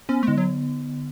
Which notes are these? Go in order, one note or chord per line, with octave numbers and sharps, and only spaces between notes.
B3 C#4
A3
D3 G#3
F#3